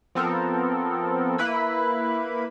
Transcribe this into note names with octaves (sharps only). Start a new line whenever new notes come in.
F3 B3 C4 A4 A#4
A#3 E4 B4 B5